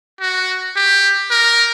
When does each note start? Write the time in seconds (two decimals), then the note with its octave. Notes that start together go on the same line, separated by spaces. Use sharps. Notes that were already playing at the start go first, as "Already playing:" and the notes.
0.20 F#4
0.76 G4
1.30 A#4